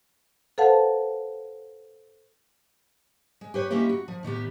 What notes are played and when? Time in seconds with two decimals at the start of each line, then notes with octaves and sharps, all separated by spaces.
0.58 A4 B4 C5 F5 F#5 A5
3.41 G#3
3.54 G4 B4 C#5
3.71 G#3 A#3 C#4 D#4 E4 G4
3.89 F#4
4.08 F3
4.23 A2 D#3 B3 G4